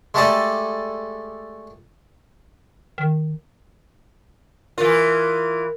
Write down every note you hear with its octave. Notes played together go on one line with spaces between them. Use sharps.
G#3 A3 G4 A4 D5 D#5
D#3
E3 F4 A#4